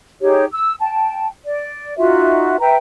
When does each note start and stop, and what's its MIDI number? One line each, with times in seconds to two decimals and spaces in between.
0.21 0.45 63
0.21 0.45 67
0.21 0.45 68
0.21 0.45 73
0.52 0.74 88
0.81 1.26 79
0.81 1.26 81
1.45 1.94 74
1.98 2.57 63
1.98 2.57 65
1.98 2.57 66
1.98 2.57 76
2.60 2.76 71
2.60 2.76 76
2.60 2.76 79
2.60 2.76 82